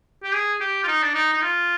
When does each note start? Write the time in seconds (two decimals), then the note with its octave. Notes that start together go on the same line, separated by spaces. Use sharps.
0.24 G4
0.34 G#4
0.60 G4
0.83 F4
0.88 D#4
1.03 D4
1.14 D#4
1.33 D#4
1.42 F4